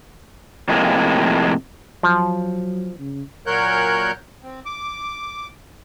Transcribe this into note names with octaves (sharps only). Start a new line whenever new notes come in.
F2 A2 C3 G#3 A#3
F3 F#3
C#3
A#2 F#3 A#4 C#5 F#6 G6
C4
D6